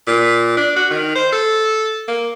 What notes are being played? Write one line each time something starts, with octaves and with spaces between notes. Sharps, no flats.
A#2
D4
F#4
D#3
C5
A4
A#3